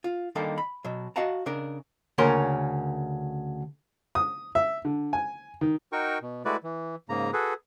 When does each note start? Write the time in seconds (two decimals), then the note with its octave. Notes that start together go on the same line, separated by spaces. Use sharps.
0.04 F4
0.35 D3 D#3 G3 A#3 D#4 A4
0.58 B5
0.84 B2 F#3
1.16 F#4 D#5 F5 F#5 A5 A#5
1.46 C#3 D4 A#4
2.18 D2 C#3 A#3 C#4 A#4 C6
4.15 D#6
4.55 E5
4.85 D3
5.13 G#5
5.61 D#3
5.92 D#4 F#4 A#4 G5 C#6
6.22 B2
6.45 G#3 A3 E4 F#4 B4 D5
6.63 E3
7.09 G#2 C#3 A#3 A#5
7.33 F#4 G#4 A4 B4